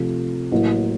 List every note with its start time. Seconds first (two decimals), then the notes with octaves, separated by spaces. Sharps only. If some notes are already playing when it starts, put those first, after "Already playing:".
Already playing: C3 F3 A3
0.51 A1 A2 F#3 A#3